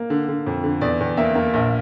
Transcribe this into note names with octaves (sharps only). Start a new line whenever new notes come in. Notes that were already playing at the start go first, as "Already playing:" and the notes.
Already playing: A#3
D3
D3
F2
D3
E2 D5
E2
A#3 E5
A#3
A#1